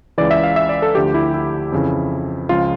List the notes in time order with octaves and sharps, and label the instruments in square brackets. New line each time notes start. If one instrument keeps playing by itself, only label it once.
[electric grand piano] C#2 C#3 E3 D5
E5
F5
E5
D5
A4
D2 D3 F3 G4
E4
E4
F2 C#3 E3
C#2 C#3 F3 F4